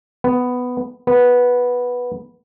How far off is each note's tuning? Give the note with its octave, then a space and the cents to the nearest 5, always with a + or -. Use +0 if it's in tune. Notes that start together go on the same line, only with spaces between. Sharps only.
B3 +10
B3 -5